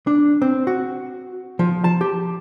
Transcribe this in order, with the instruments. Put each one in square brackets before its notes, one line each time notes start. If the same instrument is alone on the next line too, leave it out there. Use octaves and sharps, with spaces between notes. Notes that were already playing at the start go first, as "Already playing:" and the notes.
[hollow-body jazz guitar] D4
C4
F#4
F3
A5
G4